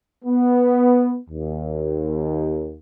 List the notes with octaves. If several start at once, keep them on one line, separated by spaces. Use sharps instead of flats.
B3
D#2